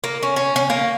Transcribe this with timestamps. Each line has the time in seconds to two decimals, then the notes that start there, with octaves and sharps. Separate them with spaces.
0.04 A#3
0.23 C#4
0.36 C#4
0.56 C#4
0.70 A#3